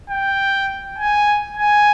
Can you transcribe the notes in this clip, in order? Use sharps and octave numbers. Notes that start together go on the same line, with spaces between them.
G5
G#5
G#5